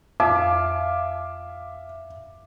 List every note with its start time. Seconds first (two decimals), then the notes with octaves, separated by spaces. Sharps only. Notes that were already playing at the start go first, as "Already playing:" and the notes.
0.20 F2 E5 F5 D6